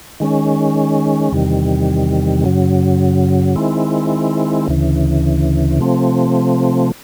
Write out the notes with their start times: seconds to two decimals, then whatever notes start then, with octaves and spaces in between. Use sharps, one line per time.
0.20 D#3 G#3 C#4
1.32 E2 C3 D#3 G3
2.44 F#2 C#3 F#3
3.56 D#3 G#3 C4 E4
4.68 D2 C#3 E3
5.79 C3 F3 A3 C4